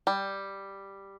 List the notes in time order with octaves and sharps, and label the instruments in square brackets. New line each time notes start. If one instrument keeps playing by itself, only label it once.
[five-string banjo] G3